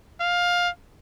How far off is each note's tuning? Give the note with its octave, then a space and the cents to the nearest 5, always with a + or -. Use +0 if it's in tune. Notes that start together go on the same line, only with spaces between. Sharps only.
F5 +15